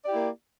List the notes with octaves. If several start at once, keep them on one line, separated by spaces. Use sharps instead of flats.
A#3 E4 G4 D5